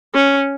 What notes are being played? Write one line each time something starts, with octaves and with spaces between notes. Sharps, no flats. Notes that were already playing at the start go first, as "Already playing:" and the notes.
C#4